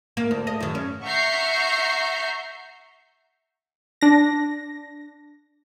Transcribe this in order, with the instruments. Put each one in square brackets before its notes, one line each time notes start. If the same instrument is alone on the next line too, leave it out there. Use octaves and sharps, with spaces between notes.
[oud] A#3
D2
D#5
F#2 D#3
C#4
[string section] E5 F#5 A#5 C#6 G6 C7
[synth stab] D4 A#6